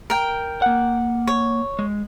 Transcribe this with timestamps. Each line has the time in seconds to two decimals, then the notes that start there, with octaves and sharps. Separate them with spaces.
0.10 A#4 G5
0.62 A#3 F#5
1.27 C#5
1.79 G#3